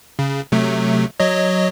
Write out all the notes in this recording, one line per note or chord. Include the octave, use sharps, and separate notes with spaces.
C#3
C3 F#3 A3
F#3 C#5 D#5